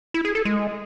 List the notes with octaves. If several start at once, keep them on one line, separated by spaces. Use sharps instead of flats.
E4
G#4
A4
G#3